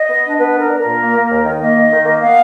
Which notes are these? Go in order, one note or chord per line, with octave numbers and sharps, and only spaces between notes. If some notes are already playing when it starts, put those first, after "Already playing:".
Already playing: D#5
B3
D4
B3 B4
D4 A#4
D4
A#2 A#4
A#3
A#3
D#2
D#3
A#3 D#5
D#3
D#3
A#3
B3 F5